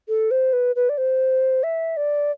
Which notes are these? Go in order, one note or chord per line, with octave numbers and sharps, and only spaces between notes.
A4
C5
B4
B4
D5
C5
E5
D5